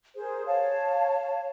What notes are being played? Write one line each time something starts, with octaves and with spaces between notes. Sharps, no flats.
G#4 A#4 C5
C#5 F5 A5